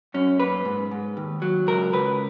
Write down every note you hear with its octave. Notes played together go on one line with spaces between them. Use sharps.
F#2 C#4
A#3 B4
G#2
G#2
D#2
F#3
C#2 A#4
C#2 B4